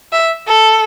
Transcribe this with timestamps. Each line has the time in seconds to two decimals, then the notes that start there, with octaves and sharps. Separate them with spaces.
0.12 E5
0.48 A4